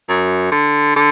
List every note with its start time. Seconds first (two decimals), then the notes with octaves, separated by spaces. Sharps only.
0.09 F#2
0.52 D3
0.96 D3